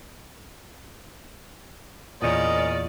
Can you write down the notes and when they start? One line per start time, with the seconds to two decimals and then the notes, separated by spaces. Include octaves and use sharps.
2.22 E2 A#2 C#4 A#4 D5 D#5